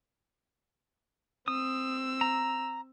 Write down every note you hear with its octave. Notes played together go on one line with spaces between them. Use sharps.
C4 D#6 E6
A#5